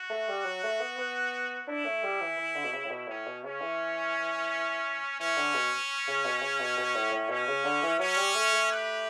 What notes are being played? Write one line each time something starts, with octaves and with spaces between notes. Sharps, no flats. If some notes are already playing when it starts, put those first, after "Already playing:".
Already playing: F#4
A3
G3
F#3
A3
B3
B3
D4 E4
A3
G3
E3
E3
D3
B2
C#3
A2
B2
A2 C#4
B2
C#3 C#4
E3
E3 C#4
D3
B2
C#3
B2
C#3
B2
B2
A2
A2
B2 C#4
C#3
D3
E3
F#3 C#4
G3
A3
A3
G4 B4